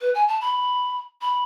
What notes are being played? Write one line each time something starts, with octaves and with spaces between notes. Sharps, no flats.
B4
G#5
A5
B5
B5